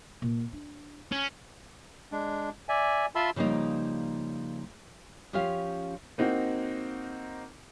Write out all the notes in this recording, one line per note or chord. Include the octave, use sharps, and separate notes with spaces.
A#2
D4
C#4
G#3 D4
D5 E5 G#5
F4 E5 A5 B5 C6 E6
C#3 F3 G3 A#3 D#4
F3 C#4 F4 G4 F5
A#3 C4 D#4 F#4